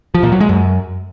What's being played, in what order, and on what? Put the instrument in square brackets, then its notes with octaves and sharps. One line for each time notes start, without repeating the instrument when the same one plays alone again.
[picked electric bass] F3
A#2
F#3
G#3
F#2